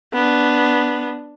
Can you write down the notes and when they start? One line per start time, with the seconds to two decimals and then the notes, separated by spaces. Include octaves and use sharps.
0.14 B3 D4